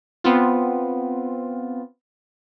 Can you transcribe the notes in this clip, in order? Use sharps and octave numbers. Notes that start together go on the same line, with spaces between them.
B3 C4 F4